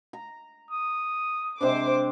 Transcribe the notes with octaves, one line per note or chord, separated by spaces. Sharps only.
A#5
D#6
C3 G#3 D4 C5 D6